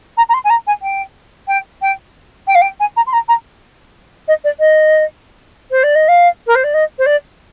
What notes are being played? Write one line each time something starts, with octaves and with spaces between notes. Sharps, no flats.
A#5
A#5
C6
G#5
A#5
G#5
G5
G5
G5
G5
F5
G5
G#5
A#5
C6
A#5
A#5
D#5
D5
D#5
C5
D5
D#5
F5
A#4
C5
D5
D#5
C5
D5